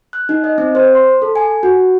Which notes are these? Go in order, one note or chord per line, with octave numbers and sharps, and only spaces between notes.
F#6
D#4
D#5
C4
C5
C6
A4
G#5
F#4